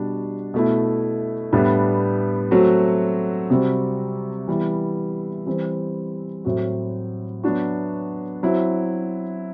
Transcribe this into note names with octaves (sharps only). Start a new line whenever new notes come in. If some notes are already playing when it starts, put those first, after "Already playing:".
Already playing: B2 G3 D4 F#4
B2 A3 E4
A2 G3 B3 D4
F#3 A3 C4 F#4
C3 G3 C4 F#4
E3 G3 B3 E4
E3 G3 C4 E4
A2 F#3 C4 F#4
F#3 B3 D4 F#4
F#3 C4 E4